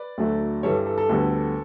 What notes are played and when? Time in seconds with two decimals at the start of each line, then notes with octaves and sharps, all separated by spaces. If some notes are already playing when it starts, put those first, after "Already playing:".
Already playing: B4 D5
0.18 D2 D3 F#3 A3
0.63 G2 E3 G3 A4 C#5
0.86 A4
0.98 A4
1.10 D2 D3 G3 B3